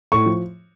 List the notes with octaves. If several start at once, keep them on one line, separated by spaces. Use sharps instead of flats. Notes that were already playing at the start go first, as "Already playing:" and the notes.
A2 C#6
F3